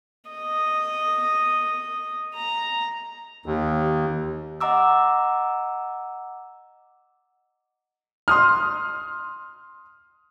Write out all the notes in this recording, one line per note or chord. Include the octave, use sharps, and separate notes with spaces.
D#5
A#5
D#2
D#5 F#5 A#5 D6 E6
C6 D#6 F6